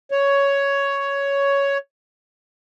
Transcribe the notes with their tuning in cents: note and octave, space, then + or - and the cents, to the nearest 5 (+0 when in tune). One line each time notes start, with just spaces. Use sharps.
C#5 +10